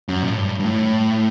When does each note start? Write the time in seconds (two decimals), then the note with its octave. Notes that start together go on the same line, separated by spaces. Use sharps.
0.09 F#2
0.22 A#2
0.30 A2
0.38 G2
0.60 G2
0.65 A2